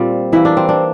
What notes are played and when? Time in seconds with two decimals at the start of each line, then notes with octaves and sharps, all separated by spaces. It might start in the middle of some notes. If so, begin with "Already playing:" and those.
Already playing: A#2 G3 C4 F4
0.33 E3 A#3 E4
0.45 D4
0.57 C4
0.69 D4